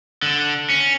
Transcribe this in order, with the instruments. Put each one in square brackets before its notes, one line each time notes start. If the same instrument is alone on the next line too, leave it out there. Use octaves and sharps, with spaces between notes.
[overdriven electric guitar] D3
C#4